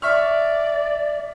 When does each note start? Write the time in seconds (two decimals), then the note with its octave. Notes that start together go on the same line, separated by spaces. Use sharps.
0.02 D5 E5 C#6 F6